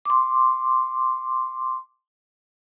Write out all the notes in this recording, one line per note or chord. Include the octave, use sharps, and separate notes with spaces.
C6 D6